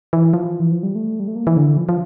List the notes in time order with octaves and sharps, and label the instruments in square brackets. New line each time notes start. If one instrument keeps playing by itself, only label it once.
[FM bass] E3
F3
E3
F3
G3
A3
G3
A3
A#3
E3
D3
F3
F3